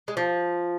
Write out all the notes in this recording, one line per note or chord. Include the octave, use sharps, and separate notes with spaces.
G#3
F3